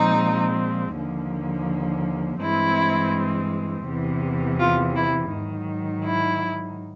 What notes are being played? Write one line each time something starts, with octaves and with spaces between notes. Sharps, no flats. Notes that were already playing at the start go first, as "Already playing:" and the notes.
Already playing: A#2 F3 G#3 C4 D#4
D#2 D3 F3 A#3
G2 E3 G#3 C4 E4
E2 C3 E3
F4
E4
G#2 D#3 F#3
E4